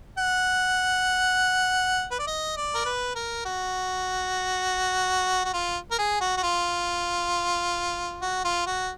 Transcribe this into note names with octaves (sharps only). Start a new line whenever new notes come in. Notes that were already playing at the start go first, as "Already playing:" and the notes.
F#5
B4
D5
D#5
D5
A#4
B4
A#4
F#4
F#4
F4
A#4
G#4
F#4
F#4
F4
F#4
F4
F#4